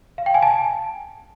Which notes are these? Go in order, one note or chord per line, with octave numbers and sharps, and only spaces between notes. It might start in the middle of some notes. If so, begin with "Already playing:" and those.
F5
G5
G#5
A5